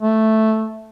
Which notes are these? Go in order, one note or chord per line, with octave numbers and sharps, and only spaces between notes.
A3